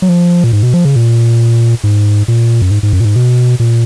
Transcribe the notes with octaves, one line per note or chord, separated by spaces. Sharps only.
F#3
F3
A#2
G#2
B2
F3
C#3
A#2
G#2
A#2
F#2
G#2
G#2
F#2
A#2
G#2
B2
A#2